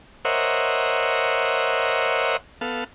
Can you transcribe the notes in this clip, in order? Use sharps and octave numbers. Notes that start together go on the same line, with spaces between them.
A#4 C5 C#5 D#5 E5 F#5
B3 A4 F5